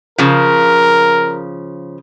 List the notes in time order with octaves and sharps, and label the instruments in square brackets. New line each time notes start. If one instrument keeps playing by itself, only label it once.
[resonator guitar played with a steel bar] C#3 F3 [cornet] A#4